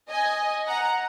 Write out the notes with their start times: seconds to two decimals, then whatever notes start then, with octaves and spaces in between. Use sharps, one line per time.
0.10 D#5 G#5
0.67 F#5 A#5